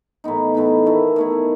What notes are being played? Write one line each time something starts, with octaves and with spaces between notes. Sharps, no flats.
A2 E3 B3 D#4
A2 E3 B3 D#4
D#3 A3 E4
D#3 A3 E4